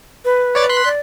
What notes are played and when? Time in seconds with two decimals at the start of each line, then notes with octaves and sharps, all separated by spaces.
0.25 B4
0.55 C#5 D5 A6
0.69 C6 F#6 B6
0.85 D5